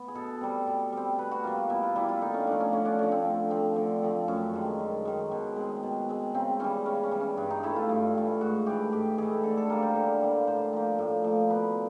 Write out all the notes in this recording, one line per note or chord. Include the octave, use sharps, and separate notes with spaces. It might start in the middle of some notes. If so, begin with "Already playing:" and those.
Already playing: B3
G#4
B2 A4
G3 C4
B2
G3 C4
B2 B4
F#4
G3 A#3 F4
B2 E4
F4
G3 A#3 E4
F4
D3 D#4
C#4
F3 A3 D4
C#4
D3 C#4
D4
F3 A3 C#4
C4
D3
F3 A3 C4
D3
F3 A3 C4
F#2 C#4
D#3 G#3
F#2
D#3 G#3
B2
G#3 C4
B2
G#3 C4
C#3 C4
E3 G3 C#4
C#3 C#4
C#4
E3 G3
C#4
G2 D4
D#4
E3 A3 E4
F4
G2
E3 A3
G#2 F#4
E3 A3 G4
G#2 G4
E3 A3 G#4
D3 A4
A4
G3 A#3 A#4
C5
D3
G3 A#3
A2 C5
F3 A#3
A2
F3 A#3
B2 B4